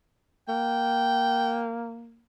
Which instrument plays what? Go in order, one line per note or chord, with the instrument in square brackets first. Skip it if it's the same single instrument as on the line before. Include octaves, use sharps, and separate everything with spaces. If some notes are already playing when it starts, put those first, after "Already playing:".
[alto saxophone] A#3 [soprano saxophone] G5